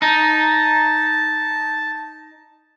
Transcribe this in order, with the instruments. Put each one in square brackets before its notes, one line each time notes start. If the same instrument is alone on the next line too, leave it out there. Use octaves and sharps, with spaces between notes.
[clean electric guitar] D#4 [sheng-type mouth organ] A5